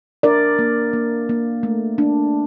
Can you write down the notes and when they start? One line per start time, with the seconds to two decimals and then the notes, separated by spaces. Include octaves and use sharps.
0.23 D4 A#4 D5
0.59 A#3
0.93 A#3
1.29 A#3
1.63 A3
1.98 D4